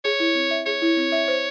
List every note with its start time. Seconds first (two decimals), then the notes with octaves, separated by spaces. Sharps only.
0.05 G#4 C#5
0.20 E4
0.35 C4
0.51 E5
0.66 G#4 C#5
0.82 E4
0.97 C4
1.12 E5
1.28 C5